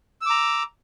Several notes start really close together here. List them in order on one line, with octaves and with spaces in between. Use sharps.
E6 D6 A#5